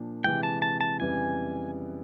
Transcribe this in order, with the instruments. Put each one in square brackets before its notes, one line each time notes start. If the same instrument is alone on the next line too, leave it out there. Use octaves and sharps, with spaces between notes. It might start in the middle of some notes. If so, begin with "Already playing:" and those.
Already playing: [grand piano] A#2 F3 A#3 D4
[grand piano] C3 E3 G#3 [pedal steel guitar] G5
[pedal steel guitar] A5
A5
A5
[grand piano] F2 C#3 E3 G3 B3 [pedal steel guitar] G#5